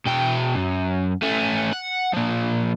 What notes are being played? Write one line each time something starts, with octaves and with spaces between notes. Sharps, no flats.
B2 G5
F#2
A3 C#4
F#5
F3 A#3